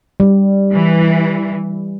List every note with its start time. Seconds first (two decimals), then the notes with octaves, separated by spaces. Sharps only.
0.20 G3
0.74 E3